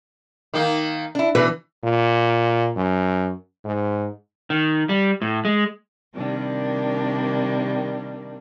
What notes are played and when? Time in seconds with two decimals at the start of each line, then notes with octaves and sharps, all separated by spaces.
0.54 D#3 A#3
1.15 D4 E4
1.35 B2 E3 B4
1.84 A#2
2.76 F#2
3.65 G#2
4.50 D#3
4.89 G3
5.22 A2
5.45 G#3
6.14 C3 D#3 G3 A#3 D4